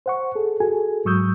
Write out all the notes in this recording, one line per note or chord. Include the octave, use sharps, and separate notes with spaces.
C5 F#5 C#6
G#4 A4
F#4 G#4 A4 G#5
G#2 F#3 C#6 D#6 E6 G6